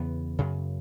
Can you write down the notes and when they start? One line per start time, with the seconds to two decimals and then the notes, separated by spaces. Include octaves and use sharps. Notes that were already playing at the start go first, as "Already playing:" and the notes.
Already playing: E2 C#3 B3
0.39 F#2 C#3